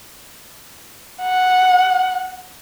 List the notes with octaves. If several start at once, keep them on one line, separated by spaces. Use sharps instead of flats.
F#5